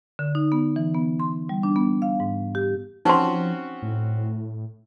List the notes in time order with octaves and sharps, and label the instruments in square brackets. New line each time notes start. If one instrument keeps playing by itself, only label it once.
[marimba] D3
D#4
B3
E3
B3
C6
G3
D4
B3
F5
G#2
G4
[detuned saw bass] F3 [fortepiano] C4 C#4 F#4 [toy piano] D#4 C6
[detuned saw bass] A2